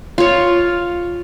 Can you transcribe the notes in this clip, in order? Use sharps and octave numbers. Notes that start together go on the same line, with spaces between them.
F4 C#5